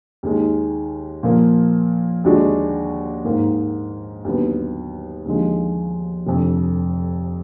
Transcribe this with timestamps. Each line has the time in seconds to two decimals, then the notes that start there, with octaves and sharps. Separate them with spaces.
0.23 D#2 D#3 G#3
1.23 A#2 F3 A#3
2.24 D#2 D3 G#3 D4 F#4
3.25 G#2 D#3 A#3
4.25 D#2 D3 F#3 B3
5.25 D#2 D3 F3 G#3
6.27 F1 F2 D3